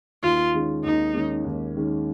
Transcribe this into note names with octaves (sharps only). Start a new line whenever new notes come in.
D#2 F4
D#3 G#3 C#4
D#2 D#4
D#3 G#3 C#4
D#2
D#3 G#3 C#4